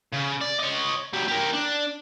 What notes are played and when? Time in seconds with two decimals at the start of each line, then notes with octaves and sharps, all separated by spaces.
0.13 C#3
0.41 D5
0.60 C#5 D#5
1.13 F#3 G4
1.28 G4 A#4
1.53 D4